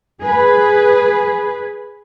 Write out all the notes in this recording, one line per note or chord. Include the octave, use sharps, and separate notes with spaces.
G#4 B4